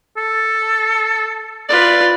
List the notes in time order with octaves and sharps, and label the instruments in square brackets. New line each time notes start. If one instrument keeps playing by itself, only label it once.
[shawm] A4
[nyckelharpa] F4 B4 [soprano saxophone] D5